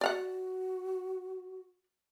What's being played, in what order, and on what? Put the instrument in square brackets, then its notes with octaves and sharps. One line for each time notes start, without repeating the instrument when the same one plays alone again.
[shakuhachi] F#4 [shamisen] D5 F5 F#5